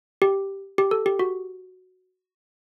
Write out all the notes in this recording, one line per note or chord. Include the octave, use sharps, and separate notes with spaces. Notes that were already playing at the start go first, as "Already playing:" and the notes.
G4
G4
A4
G4
F#4